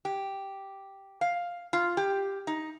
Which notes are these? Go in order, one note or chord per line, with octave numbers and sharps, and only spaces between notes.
G4
F5
F4
G4
D#4